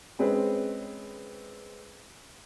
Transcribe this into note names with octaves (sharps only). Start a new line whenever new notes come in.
G#3 C4 C#4 G#4 B4